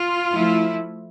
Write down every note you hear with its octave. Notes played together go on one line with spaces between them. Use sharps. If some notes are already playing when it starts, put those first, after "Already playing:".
Already playing: F4
F3 A3 E4